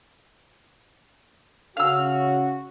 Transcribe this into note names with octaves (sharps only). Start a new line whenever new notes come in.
C#3 C#4 F#4 F5 E6